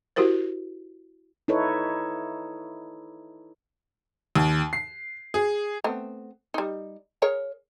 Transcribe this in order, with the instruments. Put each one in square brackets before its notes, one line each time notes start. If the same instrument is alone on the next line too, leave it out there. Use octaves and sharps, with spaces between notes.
[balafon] E4 F#4 G4 A#4 C5
[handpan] D#4 E4 A4 B4 C#5
[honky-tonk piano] D#2
C7
G#4
[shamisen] A3 B3 C4
G3 D#4
G#4 A#4 C#5